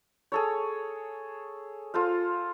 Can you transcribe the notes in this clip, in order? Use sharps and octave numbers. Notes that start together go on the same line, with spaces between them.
G#4 A4 C#5
F4 A4 C5 F5